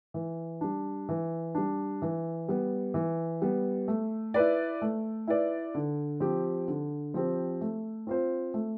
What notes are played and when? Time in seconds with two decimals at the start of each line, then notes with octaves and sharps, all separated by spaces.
0.14 E3
0.61 G3 D4
1.09 E3
1.55 G3 D4
2.02 E3
2.49 G3 B3
2.94 E3
3.42 G3 B3
3.88 A3
4.34 E4 B4 D5
4.82 A3
5.27 E4 B4 D5
5.75 D3
6.20 F3 C4 G4
6.68 D3
7.14 F3 C4 G4
7.61 A3
8.07 C4 F4 C5
8.54 A3